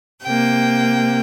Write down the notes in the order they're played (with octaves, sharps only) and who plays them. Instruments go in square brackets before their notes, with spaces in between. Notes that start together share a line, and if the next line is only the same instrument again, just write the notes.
[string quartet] C3 A#3 G5